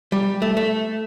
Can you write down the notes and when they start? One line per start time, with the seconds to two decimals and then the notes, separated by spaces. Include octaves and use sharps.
0.12 G3
0.42 A3
0.57 A3